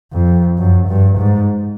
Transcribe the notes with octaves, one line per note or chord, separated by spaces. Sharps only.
F2
F#2
G2
G#2